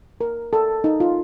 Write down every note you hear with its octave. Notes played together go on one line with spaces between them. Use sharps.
A#4
A4
D#4
F4